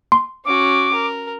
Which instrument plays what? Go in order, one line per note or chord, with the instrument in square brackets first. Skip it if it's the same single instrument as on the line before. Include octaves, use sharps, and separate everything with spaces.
[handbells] C6
[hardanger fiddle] C#4 F#4 [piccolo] D6
[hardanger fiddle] A#4